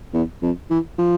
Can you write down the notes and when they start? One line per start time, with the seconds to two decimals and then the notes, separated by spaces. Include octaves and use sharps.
0.13 E2
0.42 F2
0.70 E3
0.98 F3